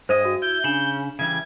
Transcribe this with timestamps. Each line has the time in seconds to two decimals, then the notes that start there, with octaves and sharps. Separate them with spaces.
0.09 G2 G#4 C5 D#5 D#6
0.25 F#4
0.42 E4 G6
0.64 C#3 D4 E7 F#7
1.19 C#3 E3 G3 G#6